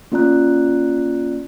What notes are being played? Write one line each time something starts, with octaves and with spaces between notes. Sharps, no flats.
A#3 C#4 F4 D5 A#5 F#6